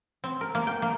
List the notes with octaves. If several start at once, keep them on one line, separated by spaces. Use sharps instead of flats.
C4
A#4
A#3
G5
A#3